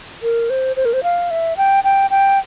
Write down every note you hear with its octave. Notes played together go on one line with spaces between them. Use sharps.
A#4
C5
C5
A#4
C5
F5
E5
G5
G5
G5